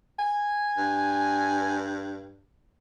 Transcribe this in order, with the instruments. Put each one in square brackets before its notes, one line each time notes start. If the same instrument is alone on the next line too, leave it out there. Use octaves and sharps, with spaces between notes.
[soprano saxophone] G#5
[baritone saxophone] G2